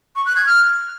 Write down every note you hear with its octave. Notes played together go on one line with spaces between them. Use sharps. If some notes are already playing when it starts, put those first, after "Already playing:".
C#6
F#6
G#6
F6